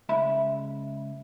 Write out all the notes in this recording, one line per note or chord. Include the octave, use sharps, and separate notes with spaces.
C#2 E5 B5